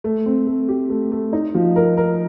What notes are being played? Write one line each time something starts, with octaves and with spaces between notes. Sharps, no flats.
A3
C4
A3
G4
A3
A3
D#4
F3
A#4
A#4